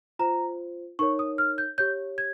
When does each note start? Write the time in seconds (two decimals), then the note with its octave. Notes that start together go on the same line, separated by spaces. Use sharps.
0.19 F4 C5 A#5
0.99 D#4 A#4 C#5 C#6
1.19 D#6
1.38 F6
1.58 G6
1.78 G4 C#5 G6
2.18 G#6